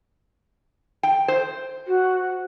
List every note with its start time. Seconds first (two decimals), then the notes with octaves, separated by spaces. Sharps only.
1.03 G5
1.28 C5
1.87 F#4